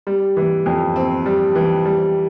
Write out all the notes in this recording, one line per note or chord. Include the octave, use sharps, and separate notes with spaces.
G3
E3
F2
C4
G3
E3
G3